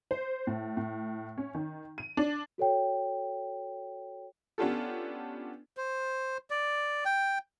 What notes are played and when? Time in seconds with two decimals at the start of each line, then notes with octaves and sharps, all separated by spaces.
0.11 C5
0.47 A2
0.77 A2
1.38 C#4
1.55 D#3
1.98 D#7
2.17 D4
2.58 F#4 A4 C#5 G5
4.58 B3 C#4 D4 F4 G4 A4
5.77 C5
6.50 D5
7.05 G5